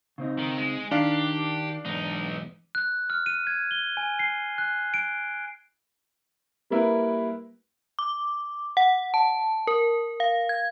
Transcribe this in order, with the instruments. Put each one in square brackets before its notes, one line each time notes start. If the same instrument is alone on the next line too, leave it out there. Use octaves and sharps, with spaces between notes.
[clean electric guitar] C#3 C4 D#4
[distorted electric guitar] D#3
G#3
[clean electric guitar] D#3 [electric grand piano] D4 F5 [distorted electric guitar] G4
[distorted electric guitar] B1 D#4 [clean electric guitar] E2 G#2
[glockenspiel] F#6
F6
D#7
G#6
G7
G#5
C7
F#6
D7
[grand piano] G3 A#3 E4 A#4 B4
[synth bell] D6
F#5
A5
A#4
F5
G#6